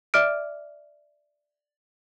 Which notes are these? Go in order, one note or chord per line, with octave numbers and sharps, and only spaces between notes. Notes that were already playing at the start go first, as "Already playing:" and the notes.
D5 E5 D6 F6 D7